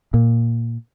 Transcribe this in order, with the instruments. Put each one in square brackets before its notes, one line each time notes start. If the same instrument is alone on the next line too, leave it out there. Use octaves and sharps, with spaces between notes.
[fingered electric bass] A#2